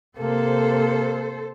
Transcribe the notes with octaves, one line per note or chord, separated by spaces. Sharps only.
C3 A#3 A4 C5